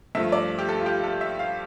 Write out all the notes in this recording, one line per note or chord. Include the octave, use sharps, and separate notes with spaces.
G2 F3 A3 E5
D5
G4
A4
F4
G4
A4
E5
F5